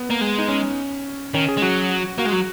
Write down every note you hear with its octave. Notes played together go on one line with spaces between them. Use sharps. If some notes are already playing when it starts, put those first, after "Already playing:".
Already playing: B3
A#3
G#3
D#4
C#4
D#3 C#4
G#4
G#3
F#3 F#4
A#3 F#4
G#3
F#3